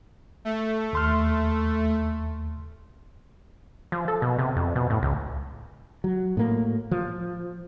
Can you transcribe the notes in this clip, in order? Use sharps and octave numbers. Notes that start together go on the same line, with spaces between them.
A3
D#2 C6 F6
F3
A4
B2
C3
F2
B2
A2
C#2
F#3
A2 A#3
F3